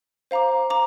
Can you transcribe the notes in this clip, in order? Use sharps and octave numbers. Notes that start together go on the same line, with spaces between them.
C5 F5 A#5 D6
A#5 D6